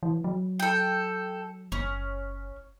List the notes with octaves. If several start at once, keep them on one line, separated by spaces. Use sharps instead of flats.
E3
F#3
A4 G5
F#1 C#4